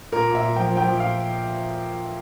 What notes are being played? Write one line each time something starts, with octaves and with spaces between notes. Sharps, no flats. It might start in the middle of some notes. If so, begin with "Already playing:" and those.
A#2 A#4
A#2
E5
A#2
F3 G5
F3
G5
F3
A#2 F5